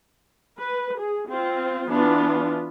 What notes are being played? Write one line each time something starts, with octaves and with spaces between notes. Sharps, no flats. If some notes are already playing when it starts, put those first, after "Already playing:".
B4
G#4
C4 F4
E3 B3 D4 F4